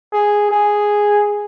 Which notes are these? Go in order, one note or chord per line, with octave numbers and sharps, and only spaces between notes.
G#4
G#4